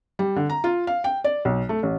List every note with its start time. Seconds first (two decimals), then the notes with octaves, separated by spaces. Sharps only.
0.19 G3
0.36 D3
0.50 A#5
0.64 F4
0.87 F5
1.04 G5
1.24 D5
1.45 B1
1.69 A3
1.83 A1